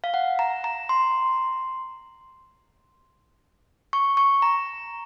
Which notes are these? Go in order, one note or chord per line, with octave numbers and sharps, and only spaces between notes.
F5
F#5
A#5
A#5
C6
C#6
C#6
A#5